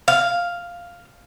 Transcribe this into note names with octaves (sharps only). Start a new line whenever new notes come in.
F5